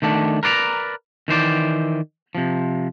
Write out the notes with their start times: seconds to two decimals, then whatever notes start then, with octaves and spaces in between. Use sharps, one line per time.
0.02 D#3 A3 D4
0.43 A#4 B4 D5 F5 A#5
1.28 D#3 E3 C5 D5
2.35 C3 F3